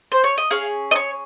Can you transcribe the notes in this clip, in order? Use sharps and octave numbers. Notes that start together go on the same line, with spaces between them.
C5
C#5
D#5
C#4 G#4 F5
D#5
C#5